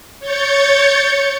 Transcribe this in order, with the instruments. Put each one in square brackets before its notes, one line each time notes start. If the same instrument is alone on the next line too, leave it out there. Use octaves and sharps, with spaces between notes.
[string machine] C#5 G6 A6 C#7